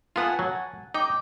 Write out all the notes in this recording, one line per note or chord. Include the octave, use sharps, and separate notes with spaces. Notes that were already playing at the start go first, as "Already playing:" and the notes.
B3 F4 F#5 G#5 A5
F#3
D#4 G5 D6